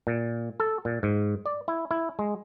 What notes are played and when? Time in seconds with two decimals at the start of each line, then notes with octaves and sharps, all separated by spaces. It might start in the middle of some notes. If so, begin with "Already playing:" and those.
0.07 A#2
0.60 A4
0.85 A#2
1.03 G#2
1.46 D5
1.68 E4
1.91 E4
2.19 G#3